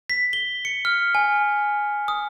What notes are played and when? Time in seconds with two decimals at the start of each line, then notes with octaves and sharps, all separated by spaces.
0.10 B6
0.33 G7
0.65 C#7
0.85 F6
1.15 G#5
2.08 D#6